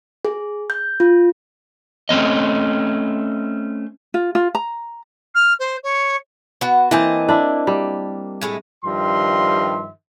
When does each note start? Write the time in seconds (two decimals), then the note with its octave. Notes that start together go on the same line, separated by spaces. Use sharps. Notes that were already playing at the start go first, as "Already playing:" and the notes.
0.25 G#4
0.70 G6
1.00 F4
2.09 A3 C4 C#4 D#5
4.14 F4
4.35 F4
4.55 A#5
5.35 F6
5.60 C5
5.84 C#5
6.61 B3 F#4
6.91 E3 A#3 C4 D#5 A5
7.29 D4 E4
7.67 G3
8.41 A2 G#3 A3
8.84 G2 D#3 F3 G3 E5 C6